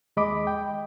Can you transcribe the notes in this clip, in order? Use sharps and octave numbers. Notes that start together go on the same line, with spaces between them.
D#2 G#3 D#5 B5 D6
G5